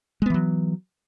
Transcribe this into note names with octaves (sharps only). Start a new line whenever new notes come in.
E3 F#3 G#3 B3